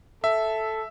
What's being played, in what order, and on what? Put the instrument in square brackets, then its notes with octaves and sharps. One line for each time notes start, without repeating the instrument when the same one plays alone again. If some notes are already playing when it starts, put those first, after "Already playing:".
[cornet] A4 [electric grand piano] E5